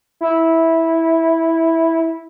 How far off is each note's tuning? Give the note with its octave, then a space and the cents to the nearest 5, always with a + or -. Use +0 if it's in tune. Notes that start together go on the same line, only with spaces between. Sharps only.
E4 -10